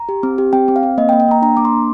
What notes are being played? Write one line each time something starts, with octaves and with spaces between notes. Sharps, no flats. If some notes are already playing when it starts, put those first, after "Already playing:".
Already playing: A#5
G4
C4
G4
C4 G5
C4
F5
C4
A#3 D#5
G5
A#3
G5
A#3 A#5
D4 A#5
A#3 D6
C6
D4